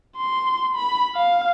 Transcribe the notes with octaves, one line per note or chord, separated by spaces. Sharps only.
C6
B5
F5